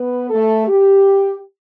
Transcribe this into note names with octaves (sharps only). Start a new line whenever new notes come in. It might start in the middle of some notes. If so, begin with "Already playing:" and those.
Already playing: B3 B4
A3 A4
G4